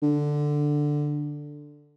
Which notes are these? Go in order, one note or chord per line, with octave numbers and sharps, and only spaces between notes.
D3